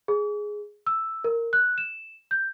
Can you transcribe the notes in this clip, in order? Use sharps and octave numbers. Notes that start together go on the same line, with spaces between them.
G#4
E6
A#4
F#6
E7
G6